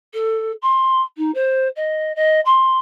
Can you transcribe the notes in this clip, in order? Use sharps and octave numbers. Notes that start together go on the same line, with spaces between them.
A4
C6
D#4
C5
D#5
D#5
C6